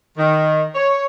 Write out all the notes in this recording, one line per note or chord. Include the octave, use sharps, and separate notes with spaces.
D#3
C#5